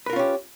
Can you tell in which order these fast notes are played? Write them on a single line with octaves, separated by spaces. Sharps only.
B4 A#4 F4 C#4 G4